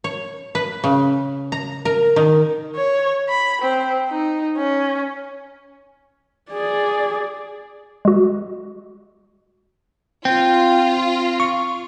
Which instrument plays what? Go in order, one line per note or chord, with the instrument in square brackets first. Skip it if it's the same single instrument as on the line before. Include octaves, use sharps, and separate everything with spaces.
[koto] C#5
B4
C#3
A#5
A#4
D#3
[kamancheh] C#5
B5
C4
D#4
C#4
[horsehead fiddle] G#4 D5
[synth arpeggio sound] G#3 F#4
[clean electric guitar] C4 [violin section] F4 [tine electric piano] G5
[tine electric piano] C#6